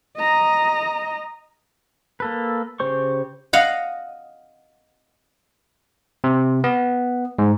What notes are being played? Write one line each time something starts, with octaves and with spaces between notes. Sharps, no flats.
D#5 A#5
A#3 A4 B4
C#3 G4 C5 C#6
D#5 F5 F#5
C3
B3
G#2